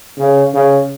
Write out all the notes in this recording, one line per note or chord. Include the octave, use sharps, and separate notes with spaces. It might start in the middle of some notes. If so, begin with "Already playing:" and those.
C#3
C#3